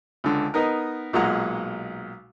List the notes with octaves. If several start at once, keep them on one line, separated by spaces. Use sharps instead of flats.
C#2 D3
B3 D#4 A#4
B1 A#2 G#3 F#5 A#5